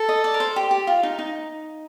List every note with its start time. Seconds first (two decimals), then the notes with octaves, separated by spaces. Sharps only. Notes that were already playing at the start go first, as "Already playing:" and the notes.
Already playing: A4
0.09 D#5
0.24 D5
0.34 A#4
0.40 C5
0.56 G4
0.71 G4
0.87 F4
1.03 D#4
1.19 D#4